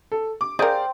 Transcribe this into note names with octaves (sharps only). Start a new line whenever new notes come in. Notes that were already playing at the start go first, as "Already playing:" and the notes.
A4
D6
G#4 A#4 C5 D5 F5 G5